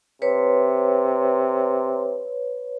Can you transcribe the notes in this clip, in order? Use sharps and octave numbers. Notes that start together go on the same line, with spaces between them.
C3 B4 C#5